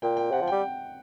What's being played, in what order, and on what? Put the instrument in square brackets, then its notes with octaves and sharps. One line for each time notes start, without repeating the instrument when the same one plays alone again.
[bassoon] A#2 [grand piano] G5
[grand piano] G5
[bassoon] C3 [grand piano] F#5
[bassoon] F3
[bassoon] G3 [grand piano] G5